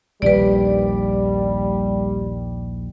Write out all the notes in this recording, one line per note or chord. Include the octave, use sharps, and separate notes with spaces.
A#1 D#2 D#3 G3 B4 D5